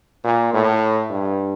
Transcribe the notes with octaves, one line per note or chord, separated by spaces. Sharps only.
A#2
A2
G2